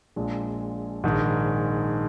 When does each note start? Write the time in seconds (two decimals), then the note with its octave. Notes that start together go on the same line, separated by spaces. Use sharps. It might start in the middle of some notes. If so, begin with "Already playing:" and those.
0.16 A#1 A#2 G#3
1.04 A#1 G#2 D#3 G#3